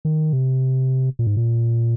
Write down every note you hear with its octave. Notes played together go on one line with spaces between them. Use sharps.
D#3
C3
A#2
G#2
A#2